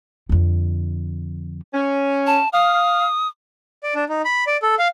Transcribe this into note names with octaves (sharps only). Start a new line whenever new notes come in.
F2 D3
C#4
A5
F5 D#6
D5
D4
D#4
B5
D5
A4
F5